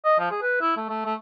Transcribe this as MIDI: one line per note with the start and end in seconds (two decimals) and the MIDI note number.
0.04 0.17 75
0.19 0.31 53
0.31 0.39 68
0.42 0.58 71
0.61 0.74 64
0.77 0.86 57
0.89 1.01 57
1.05 1.14 57